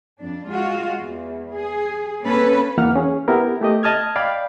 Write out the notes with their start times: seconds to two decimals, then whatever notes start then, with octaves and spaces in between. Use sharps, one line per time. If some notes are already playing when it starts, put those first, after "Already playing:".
0.20 F2 D4
0.50 G#3 F4 F#4
1.01 E2
1.54 G#4
2.22 A#3 C4 C#4 A4 B4
2.78 E2 E3 A#3 F#5 F6
2.96 C#4 G#4
3.28 B3 E4 G4 A#4
3.61 A3 G4 D#5
3.83 D#5 A5 D#6 F6 G#6
4.16 D5 F5 G5 B5